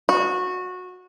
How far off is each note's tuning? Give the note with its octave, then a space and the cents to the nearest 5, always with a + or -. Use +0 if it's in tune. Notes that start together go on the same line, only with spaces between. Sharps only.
F#4 -20